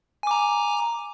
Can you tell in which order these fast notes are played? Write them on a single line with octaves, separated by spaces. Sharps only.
G#5 D6 A#5